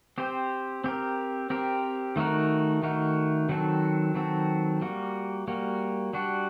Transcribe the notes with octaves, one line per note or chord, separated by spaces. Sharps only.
C4 G4 C5
C4 G4 A#4
C4 G4 A#4
D#3 A3 D#4 F#4 A#4
D#3 A3 D#4 F#4 A#4
D#3 F#3 C4 F#4 A4
D#3 F#3 C4 F#4 A4
G3 A#3 F#4
G3 A#3 F#4
G3 D4 F#4